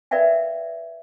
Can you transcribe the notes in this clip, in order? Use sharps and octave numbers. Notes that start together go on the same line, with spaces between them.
A#4 B4 D5 E5 F5 G5